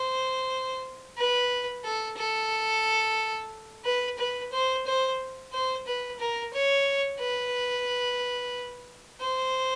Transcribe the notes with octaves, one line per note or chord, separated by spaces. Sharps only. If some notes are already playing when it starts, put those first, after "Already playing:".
Already playing: C5
B4
A4
A4
B4
B4
C5
C5
C5
B4
A#4
C#5
B4
C5